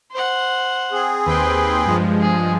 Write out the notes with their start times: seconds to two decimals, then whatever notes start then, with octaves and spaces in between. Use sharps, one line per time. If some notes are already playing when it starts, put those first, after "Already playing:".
0.12 C5 F#5
0.92 C4 G#4
1.26 D#2 B4 G5 C6
1.85 G2 F3 G#3
2.21 G#4